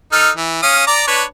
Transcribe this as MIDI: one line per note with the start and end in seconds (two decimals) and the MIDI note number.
0.13 0.30 63
0.13 0.30 69
0.13 0.30 89
0.36 0.60 52
0.63 0.85 61
0.63 0.85 77
0.63 0.85 87
0.87 1.04 74
0.87 1.04 82
0.87 1.04 86
1.07 1.23 62
1.07 1.23 71
1.07 1.23 73